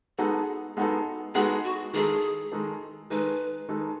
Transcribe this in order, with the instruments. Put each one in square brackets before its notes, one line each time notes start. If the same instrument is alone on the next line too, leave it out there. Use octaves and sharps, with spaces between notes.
[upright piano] G#3 B3 D#4 F#4 A4 [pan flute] G#4
[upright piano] G#3 B3 D#4 F#4 A4
[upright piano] G#3 B3 D#4 F#4 A4 [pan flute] G#4
[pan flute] F#4
[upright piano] D#3 G#3 D#4 A4 [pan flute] G#4
[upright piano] D#3 G#3 D#4 A4
[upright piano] D#3 G#3 D#4 A4 [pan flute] B4
[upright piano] D#3 G#3 D#4 A4